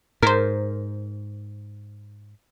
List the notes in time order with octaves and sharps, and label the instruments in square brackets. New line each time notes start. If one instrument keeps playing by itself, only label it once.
[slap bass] G#2 [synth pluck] A#4 C5